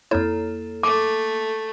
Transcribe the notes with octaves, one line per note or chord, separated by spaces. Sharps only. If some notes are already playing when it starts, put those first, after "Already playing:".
F2 A#3 E4 A4 C#5
A3 D6